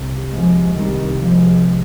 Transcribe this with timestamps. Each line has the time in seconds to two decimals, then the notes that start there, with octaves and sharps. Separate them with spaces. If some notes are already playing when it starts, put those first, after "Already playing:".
Already playing: C2 C3
0.32 F3 G#3
0.75 D#3 G3
1.20 F3 G#3